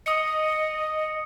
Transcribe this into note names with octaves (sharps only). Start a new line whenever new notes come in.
D#5 D#6 C#7